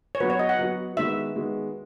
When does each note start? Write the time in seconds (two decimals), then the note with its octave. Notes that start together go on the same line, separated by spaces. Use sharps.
0.15 C#5
0.20 F#3 B3 F#4 B4
0.30 C#5
0.39 D#5
0.49 F#5
0.59 F#3 B3 F#4
0.97 D#3 G#3 B3 F#4 E5
1.36 D#3 G#3 B3 F#4